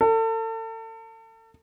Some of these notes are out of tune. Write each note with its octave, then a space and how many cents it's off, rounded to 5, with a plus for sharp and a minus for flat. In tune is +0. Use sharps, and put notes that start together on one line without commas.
A4 +35